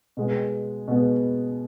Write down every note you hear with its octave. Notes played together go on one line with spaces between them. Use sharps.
B2 G#3 B3
B2 G#3 B3